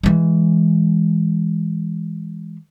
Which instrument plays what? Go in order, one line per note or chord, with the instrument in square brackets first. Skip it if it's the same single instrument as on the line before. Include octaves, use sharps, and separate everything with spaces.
[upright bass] E3 G#3